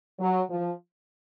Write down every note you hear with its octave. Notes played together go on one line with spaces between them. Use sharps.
F#3
F3